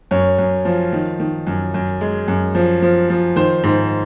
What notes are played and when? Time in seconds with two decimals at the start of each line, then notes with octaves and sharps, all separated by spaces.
0.11 F#2 C#5
0.39 F#2
0.65 F3
0.93 D#3
1.20 D#3
1.47 F#2
1.74 F#2
2.01 G#3
2.28 F#2
2.55 F3
2.82 F3
3.10 F3
3.36 D#3 C5
3.64 G#2